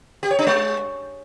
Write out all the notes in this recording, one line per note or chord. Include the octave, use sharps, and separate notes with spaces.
G4
C#5
D4
G#3